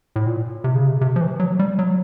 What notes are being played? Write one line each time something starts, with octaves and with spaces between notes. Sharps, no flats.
A2
A#2
C3
C#3
C3
C3
F3
E3
F#3
G3
F#3